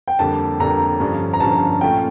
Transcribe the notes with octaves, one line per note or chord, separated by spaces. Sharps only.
G5
F2 D3 G3 A#3 A5
F2 D3 G3 A#3 A#5
G2 D3 F3 C#4
A#5
G2 D3 F3 C#4 A5
A#2 A3 C#4 F4 G5